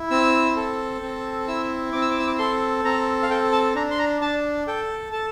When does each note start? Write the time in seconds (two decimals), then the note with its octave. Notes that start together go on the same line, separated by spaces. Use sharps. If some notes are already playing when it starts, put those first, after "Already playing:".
Already playing: E4
0.10 C4 E6
0.56 A4
1.02 C4
1.48 E4 E6
1.93 C4 D6
2.02 E6
2.11 D6
2.20 E6
2.27 D6
2.38 A4 C6
2.85 C4 A#5
3.23 F5
3.30 A4 G5
3.52 A5
3.75 D4 A#5
3.91 C6
3.98 A#5
4.21 D4 A5
4.67 A4 G5
5.12 A4 A5